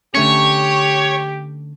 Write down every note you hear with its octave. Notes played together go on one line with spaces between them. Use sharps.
D3 A3 C#4 G4 C#5